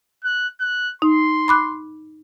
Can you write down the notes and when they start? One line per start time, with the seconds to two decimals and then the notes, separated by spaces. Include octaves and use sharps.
0.24 F#6
0.60 F#6
1.02 D#4 C6
1.48 B5 D6 F#6